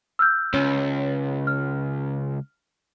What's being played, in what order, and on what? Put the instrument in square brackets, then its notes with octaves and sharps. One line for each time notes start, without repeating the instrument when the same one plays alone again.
[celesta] E6 F6 G6
[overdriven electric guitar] C#2 [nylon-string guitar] C#4
[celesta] F6